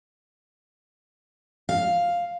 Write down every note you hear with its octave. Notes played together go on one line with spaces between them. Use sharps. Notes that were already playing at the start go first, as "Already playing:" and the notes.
F5